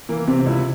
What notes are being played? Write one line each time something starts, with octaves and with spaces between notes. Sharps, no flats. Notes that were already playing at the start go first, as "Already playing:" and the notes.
E3 A#3
C3 C4
C#2 E4